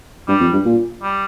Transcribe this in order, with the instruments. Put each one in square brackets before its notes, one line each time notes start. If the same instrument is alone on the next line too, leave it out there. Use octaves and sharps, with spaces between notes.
[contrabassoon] G2 [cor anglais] G3
[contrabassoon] F2
G2
A#2
[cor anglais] G3